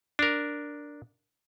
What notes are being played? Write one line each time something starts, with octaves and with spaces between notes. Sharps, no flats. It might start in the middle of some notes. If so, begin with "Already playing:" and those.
D4 A#4